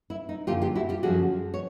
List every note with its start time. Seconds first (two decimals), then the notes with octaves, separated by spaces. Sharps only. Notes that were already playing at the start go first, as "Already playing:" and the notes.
0.10 E4
0.29 D#4
0.47 F#2 D3 F3 A#3 C#4 F4 G4
0.62 F4 G4
0.75 E4 F#4
0.89 F4 G4
1.03 F#2 D3 F3 A#3 C#4 F#4 G#4
1.54 C#5